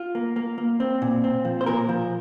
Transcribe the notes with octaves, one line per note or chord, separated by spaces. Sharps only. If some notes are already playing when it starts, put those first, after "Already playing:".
Already playing: F4
A#3
A#3
A#3
C4
A#2
C4
F3
C5
A#2 A#4
F3